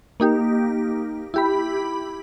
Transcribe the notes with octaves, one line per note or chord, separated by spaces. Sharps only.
A#3 D#4 G4
E4 G4 B5